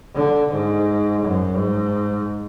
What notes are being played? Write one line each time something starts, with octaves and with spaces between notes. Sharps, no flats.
D3
G#2
F#2
G#2